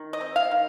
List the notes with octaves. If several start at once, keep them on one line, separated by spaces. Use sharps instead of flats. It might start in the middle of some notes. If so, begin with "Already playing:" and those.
Already playing: D#3
D#5
C4
F5
D#3